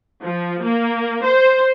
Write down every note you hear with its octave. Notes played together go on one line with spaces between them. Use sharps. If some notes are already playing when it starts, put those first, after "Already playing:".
F3
A#3
C5